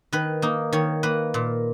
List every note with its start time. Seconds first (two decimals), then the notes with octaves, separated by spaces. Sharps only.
0.13 D#3 B4
0.42 A#3 D#4
0.72 D#3 C#5
1.03 A#3 B4
1.34 A#2